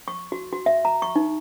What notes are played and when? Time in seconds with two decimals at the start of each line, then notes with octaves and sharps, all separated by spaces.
0.08 C#6
0.32 F#4
0.52 F#4
0.66 E5
0.85 A#5
1.02 C#6
1.16 D#4